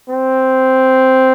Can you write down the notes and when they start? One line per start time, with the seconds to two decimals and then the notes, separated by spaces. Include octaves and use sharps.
0.09 C4